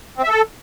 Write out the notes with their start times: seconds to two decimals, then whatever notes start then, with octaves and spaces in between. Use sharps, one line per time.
0.18 C4
0.23 E5
0.29 A4